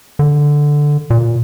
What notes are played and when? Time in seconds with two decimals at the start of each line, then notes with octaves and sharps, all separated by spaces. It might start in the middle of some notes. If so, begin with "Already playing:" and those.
0.19 D3
1.10 A#2